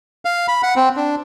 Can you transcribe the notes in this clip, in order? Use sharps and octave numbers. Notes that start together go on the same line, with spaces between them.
F5
B5
F#5
C4
D4